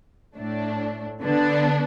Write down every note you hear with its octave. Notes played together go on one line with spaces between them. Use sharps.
A2 A3 D4
D3 B3 D4